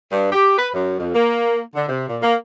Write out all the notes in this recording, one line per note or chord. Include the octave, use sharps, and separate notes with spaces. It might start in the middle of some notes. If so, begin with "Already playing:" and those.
G2
G4
B4
F#2
F2
A#3
D3
C3
A#2
A#3